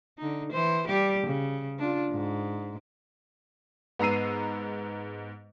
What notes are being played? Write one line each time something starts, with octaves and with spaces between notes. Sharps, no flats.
D3 D#4
E3 C5
G3 G4
C#3
D4 F4
G#2
G#2 B3 A#5 E6 C7 D#7